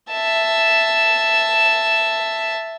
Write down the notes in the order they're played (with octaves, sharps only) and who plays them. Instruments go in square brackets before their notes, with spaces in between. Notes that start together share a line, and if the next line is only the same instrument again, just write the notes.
[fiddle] E5 A5